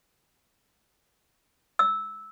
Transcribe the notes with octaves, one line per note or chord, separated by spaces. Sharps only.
E6